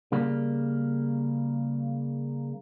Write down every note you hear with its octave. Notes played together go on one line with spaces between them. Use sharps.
C#3 G3 A#3